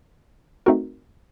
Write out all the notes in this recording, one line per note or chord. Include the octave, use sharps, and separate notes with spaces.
A3 C4 D#4 F#4 A#4